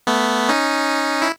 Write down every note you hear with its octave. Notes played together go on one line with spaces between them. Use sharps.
A3 B3
C#4 D#4
E4